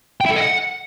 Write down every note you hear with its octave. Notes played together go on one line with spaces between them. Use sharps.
G5
E4
A4
D#5
F#5